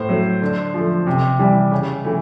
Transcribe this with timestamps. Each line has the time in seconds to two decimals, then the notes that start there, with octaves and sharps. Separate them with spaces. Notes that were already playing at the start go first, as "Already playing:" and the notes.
Already playing: A2 C5
0.09 F#3 A3
0.42 D3
0.74 F3 A3
1.07 C3
1.39 E3 G3
1.71 C#3
2.04 E3 A3